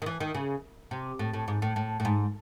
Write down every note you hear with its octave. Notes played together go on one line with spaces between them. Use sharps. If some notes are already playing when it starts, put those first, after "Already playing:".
D#3
E3
D#3
C#3
C3
A2
A2
G#2
A2
A2
A2
G#2